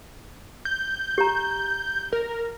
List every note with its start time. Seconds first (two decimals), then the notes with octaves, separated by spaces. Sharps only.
0.65 G6
1.18 G4 A#5
2.13 A#4